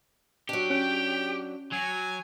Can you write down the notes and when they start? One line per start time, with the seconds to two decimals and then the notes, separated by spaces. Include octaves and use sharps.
0.49 F#3 D4 G4
0.70 C#4 G5
1.72 F#3 G#5